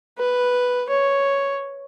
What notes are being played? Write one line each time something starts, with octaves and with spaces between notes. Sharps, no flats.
B4
C#5